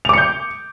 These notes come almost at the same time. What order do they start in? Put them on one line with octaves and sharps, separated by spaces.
F7 D6 C#7 G6